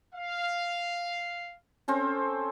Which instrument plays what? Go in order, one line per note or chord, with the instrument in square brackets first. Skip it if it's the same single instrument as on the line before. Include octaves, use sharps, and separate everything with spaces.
[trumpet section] F5
[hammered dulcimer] C4 C#4 A4